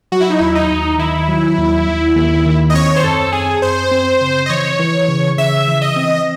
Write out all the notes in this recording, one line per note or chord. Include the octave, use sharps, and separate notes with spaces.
F#3 F#4
E4
D#4
D#2 E4
D#4
D#2
D#3 E4
F#3
D#2
D#2
D#2
D#3
D#5
C4 C#5
C5
F#2 A4
C4 G#4
F#2 C5
C4
C#3
D#5
E3 C#5
E3
C#3
C#3 E5
E3
D#5
C4